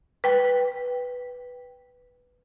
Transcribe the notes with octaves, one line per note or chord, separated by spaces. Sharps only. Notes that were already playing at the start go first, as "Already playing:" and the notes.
B4 G5